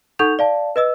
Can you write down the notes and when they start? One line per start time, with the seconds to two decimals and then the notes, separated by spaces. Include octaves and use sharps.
0.19 D#4 A4 F#5 C#6 G6 F7
0.39 D5 F5 A5
0.76 B4 D#5 E6